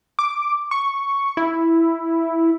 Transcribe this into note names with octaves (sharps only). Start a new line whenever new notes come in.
D6
C#6
E4